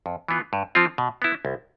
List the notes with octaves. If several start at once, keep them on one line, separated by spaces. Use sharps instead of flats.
F2
E3 B3 F4
G2
F3 C4 F4
B2
B3 E4
C2